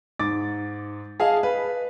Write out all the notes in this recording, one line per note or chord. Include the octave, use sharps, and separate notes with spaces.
G#2 D6 A6
G#4 D#5 F5 G#5 A5
B4